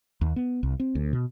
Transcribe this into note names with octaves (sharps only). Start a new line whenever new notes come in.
D#2
B3
C2
C4
D2
B2